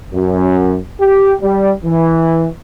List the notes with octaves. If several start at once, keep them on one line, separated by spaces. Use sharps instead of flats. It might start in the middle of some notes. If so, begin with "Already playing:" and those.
F#2
G4
G3
E3